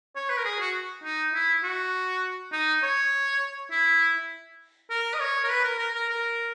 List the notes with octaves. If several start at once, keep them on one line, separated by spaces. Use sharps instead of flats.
C#5
B4
A#4
G#4
F#4
D#4
E4
F#4
D#4
C#5
E4
A#4
D#5
C#5
A#4
B4
A#4
A#4
A#4
A#4